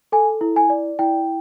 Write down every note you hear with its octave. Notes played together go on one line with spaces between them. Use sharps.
A4 G#5
E4
G#5
D5
E4 G5